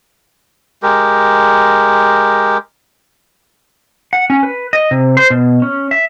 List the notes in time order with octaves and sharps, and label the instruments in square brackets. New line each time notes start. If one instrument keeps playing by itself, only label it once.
[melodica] G#3 G4 A#4
[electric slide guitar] F#5
C#4
B4
D#5
C3
C5
B2
C#4
E5